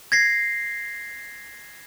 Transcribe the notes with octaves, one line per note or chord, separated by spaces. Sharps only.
G#6 A#6 C7